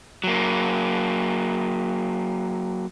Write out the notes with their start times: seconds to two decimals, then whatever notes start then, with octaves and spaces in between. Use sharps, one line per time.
0.24 F#3 A#3